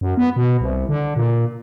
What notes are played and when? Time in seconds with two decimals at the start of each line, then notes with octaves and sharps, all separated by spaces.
0.01 F#2
0.17 B3
0.36 B2
0.61 C2
0.89 D3
1.16 A#2